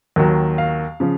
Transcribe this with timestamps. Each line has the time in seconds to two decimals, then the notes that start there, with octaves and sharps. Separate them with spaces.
0.16 D#2 D#3 F#3
0.58 F5
1.00 C#3 F3